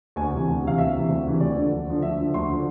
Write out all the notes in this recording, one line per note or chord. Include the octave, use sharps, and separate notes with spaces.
D2 G#5
C3 E3
D2
C3 E3 F5
D2 E5
C3 E3
D2
C3 E3
D2 D5
D3 F3
D2
D3 F3
D2 E5
D3 F3
D2 C6
D3 F3